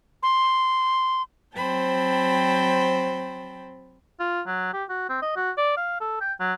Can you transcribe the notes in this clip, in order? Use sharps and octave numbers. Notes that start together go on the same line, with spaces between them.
C6
F#3 C4 C5 G5 A5 B5
F4
F#3
G4
F#4
C4
D#5
F#4
D5
F5
A4
G5
F#3